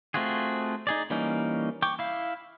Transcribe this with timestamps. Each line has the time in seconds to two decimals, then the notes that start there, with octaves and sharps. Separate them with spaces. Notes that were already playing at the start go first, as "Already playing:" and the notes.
0.14 A3 C4 F4 F#4 G#4
0.87 D#4 G#4 D5
1.10 E3 G3 A#3 C#4 D#4
1.82 G5 C#6 D6
1.99 E4 F5